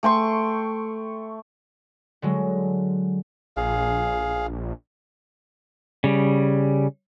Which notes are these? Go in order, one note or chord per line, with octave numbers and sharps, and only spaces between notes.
A3 G5 C6 C#6
D3 F#3 G#3
A#1 G#4 F5
C#3 G3